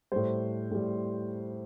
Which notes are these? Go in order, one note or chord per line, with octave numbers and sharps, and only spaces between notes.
A2 G3 C5
A2 G3